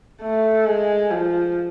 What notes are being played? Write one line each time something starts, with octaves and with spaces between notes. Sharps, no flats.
A3
G#3
F3